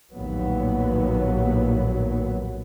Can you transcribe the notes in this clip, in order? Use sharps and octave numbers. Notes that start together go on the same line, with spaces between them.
A#1 D#2 A2 F#3 B3